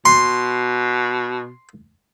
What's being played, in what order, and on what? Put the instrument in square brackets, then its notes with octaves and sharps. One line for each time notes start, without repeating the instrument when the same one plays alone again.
[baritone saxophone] B2 [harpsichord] C6